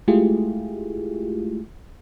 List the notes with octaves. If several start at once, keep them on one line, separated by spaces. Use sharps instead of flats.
G#3 A3 E4 F4 G4 G#4